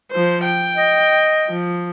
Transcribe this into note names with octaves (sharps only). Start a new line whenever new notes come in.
F3 C5
G5
D#5
F3